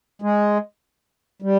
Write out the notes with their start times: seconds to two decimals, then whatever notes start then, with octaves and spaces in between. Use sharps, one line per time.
0.22 G#3
1.42 G3